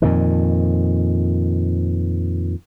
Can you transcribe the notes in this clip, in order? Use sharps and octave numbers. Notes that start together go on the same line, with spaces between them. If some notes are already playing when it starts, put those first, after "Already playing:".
F2 A#2 D#3